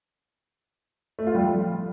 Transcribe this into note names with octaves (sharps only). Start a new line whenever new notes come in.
A3
F4
G3
F3